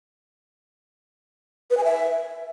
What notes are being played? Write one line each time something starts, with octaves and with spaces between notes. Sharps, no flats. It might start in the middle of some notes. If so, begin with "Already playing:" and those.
B4
G#5
E5